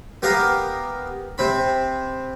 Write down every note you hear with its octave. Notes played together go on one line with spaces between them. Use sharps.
B3 G4 A#4 F5 D#6
C3 C4 B5